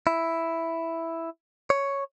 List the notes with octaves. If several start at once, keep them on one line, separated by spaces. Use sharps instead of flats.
E4
C#5